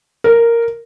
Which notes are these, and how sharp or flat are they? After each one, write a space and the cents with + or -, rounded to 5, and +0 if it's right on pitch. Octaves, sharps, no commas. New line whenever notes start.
A#4 -5